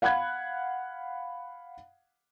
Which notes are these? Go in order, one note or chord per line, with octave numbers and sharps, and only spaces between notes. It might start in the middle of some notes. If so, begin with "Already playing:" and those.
F5 F#5 B5 F#6 G#6